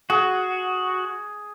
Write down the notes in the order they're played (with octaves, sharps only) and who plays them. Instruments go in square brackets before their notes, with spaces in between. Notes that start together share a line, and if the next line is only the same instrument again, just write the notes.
[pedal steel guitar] F#4 [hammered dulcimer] G#4